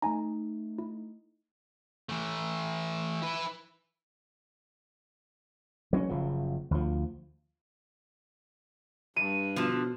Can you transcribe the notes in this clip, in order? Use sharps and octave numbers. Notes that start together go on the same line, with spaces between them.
A3 D#4 G#5 A#5
E4
E3 A3
E4 B4
F#3 C4 C#4
F#1 C#3 F3
D2 F3
G2 D#7
B2 D3 F3